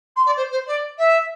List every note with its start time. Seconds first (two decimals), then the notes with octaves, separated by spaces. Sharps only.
0.16 C6
0.25 D5
0.36 C5
0.51 C5
0.66 D5
0.98 E5